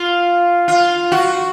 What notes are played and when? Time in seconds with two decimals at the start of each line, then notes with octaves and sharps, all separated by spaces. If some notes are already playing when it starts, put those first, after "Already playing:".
Already playing: F4
0.68 F4
1.12 F#4